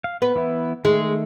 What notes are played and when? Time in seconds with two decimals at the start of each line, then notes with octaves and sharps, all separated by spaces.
0.04 F5
0.22 B3 B4
0.35 E3 B3 E4
0.85 D#3 G#3 A3